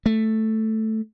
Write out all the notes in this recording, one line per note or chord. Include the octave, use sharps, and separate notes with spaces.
A3